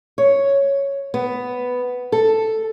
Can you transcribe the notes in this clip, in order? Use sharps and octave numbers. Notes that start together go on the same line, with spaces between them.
C#5
B3
A4